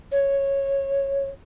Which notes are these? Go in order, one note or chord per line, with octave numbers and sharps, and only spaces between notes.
C#5